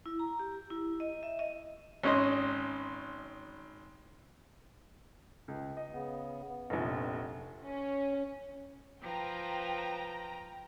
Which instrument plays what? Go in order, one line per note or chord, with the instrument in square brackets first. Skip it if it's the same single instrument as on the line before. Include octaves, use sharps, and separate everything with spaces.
[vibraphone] E4
A#5
G4
E4
D#5
E5
D#5
[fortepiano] G#1 C#4 D#5 C6
[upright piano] C#2
D#5
[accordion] C#3 B3
B3
[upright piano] F1 A#1
[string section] C#4
[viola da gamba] F3 B4 [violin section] G5 A#5